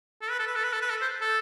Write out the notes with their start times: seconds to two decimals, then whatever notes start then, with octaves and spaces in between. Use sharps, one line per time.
0.22 A4
0.30 B4
0.39 A4
0.47 B4
0.56 A4
0.64 B4
0.73 A4
0.82 B4
0.90 A4
1.01 C5
1.21 A4